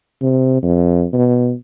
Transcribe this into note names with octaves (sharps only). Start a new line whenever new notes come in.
C3
F2
B2